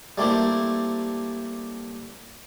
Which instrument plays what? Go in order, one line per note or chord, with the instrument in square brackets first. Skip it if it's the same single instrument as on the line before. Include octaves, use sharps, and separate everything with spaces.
[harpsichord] G3 A3 A#3 C4 E4 G4